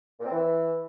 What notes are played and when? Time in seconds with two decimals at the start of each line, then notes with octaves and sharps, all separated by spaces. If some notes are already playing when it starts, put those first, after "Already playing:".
0.20 A#2
0.26 C4
0.31 E3